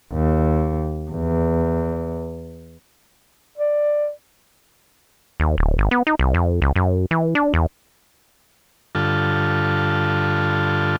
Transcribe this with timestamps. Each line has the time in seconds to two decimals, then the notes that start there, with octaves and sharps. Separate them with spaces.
0.13 D#2
1.11 E2
3.58 D5
5.40 D#2
5.58 D1
5.78 G#1
5.91 B3
6.07 D#4
6.19 C2
6.34 F2
6.62 C#2
6.76 F#2
7.11 E3
7.35 D4
7.54 E2
8.95 G2 D3 F4 A4